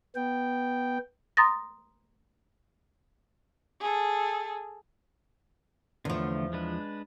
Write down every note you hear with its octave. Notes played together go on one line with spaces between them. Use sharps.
B3 G5
A#5 C6 D#6 A6 A#6
G#4 A4
E2 D3 F3 A3
G#3 D4 B4